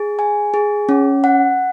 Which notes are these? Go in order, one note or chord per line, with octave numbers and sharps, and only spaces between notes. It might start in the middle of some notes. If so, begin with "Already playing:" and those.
Already playing: G#4
G#5
G#4
C#4
F#5